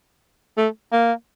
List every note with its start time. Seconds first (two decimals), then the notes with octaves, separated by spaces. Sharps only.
0.57 A3
0.92 A#3